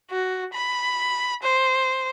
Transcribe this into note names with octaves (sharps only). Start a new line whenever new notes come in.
F#4
B5
C5